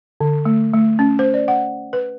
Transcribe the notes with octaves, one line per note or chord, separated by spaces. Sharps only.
D3
A3
A3
C#4
C5
D5
F#5
B4